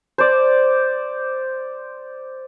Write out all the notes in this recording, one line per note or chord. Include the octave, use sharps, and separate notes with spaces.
C5 D5